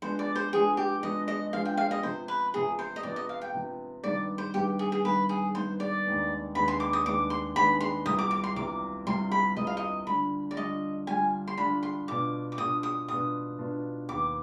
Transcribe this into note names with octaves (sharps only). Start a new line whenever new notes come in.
F3 G#3 B3 D4 C5
D5
C5
F3 G#3 B3 D4 G#4
G4
F3 G#3 B3 D4 D#5
D#5
F3 G#3 B3 D4 F5
G5
F5
D#5
C3 F3 B3 C5
B4
C3 F3 B3 G#4
C5
D#5
C3 F3 B3 D5
D#5
F5
G5
C3 F3 B3
G2 D#3 B3 D5
C5
G2 D#3 B3 G4
G#4
G#4
G2 D#3 B3 B4
G#4
G2 D#3 B3 C5
D5
D#2 D#3 G#3 B3 D4
D#2 D#3 G#3 B3 D4 B5
C6
D6
D#6
D#2 D#3 G#3 B3 D4 D6
C6
D#2 D#3 G#3 B3 D4 B5
C6
C2 C3 G3 B3 F4 D#6
D6
D6
C6
C2 C3 G3 B3 F4 D6
C2 C3 G3 B3 F4 C6
B5
C2 C3 G3 B3 F4 D#5
F5
D#5
D3 G3 D4 F4 B5
D5
D3 G3 D4 F4 D#5
D3 G3 D4 F4 G#5
C6
D3 G3 D4 F4 B5
C6
B2 B3 D4 F4 D6
D6
B2 B3 D4 F4 D#6
D#6
B2 B3 D4 F4 D#6
B2 B3 D4 F4
D#2 D#3 B3 D6